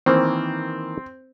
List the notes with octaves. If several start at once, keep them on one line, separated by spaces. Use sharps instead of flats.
D#3 E3 A#3 C4